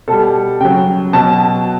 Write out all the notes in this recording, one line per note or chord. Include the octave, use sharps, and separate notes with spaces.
B2 G3 A4
C#3 F#3 G5
B2 F#3 A5